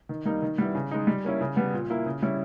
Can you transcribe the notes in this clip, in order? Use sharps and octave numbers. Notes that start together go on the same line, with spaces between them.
D#3
G3 A#3 D#4
D#3
G3 B3 E4
C#3
G#3 D#4
G3
A#3 C#4 E4
C#3
G3 B3
A#2
A#3 E4
C#3
G3 C#4 E4